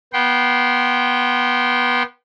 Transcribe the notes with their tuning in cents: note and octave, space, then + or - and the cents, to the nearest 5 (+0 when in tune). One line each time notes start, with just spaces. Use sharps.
B3 -20 G5 -25 C6 +0